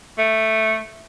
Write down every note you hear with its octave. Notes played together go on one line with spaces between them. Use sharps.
A3